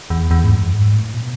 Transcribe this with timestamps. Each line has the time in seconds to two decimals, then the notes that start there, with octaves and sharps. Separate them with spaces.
0.10 E2
0.31 E2
0.44 G#2
0.52 F#2
0.73 G#2
0.93 A2
1.14 B2